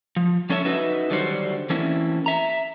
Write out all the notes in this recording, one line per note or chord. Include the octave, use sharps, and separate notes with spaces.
F3
F3 C#4 A4 C#5 D#5 E5
D#4 F#4 B4 E5
D3 D#3 F#3 G3 F#4 C5
E3 A3 A#3 C4 C#4 E4
E5 A#5